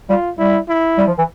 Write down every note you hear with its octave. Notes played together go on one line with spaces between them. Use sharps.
G3 F4
G3 E4
E4
G3
F3
E3